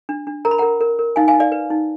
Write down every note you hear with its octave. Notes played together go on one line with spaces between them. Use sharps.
D4
D4
A#4 A#5
B5
A#4 F#5 A#5
A#4
A#4
D#4 F5 G#5
F5 G#5
D#4
D5 F5
B4
D#4